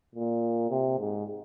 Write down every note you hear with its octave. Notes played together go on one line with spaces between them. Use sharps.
A#2
C3
G#2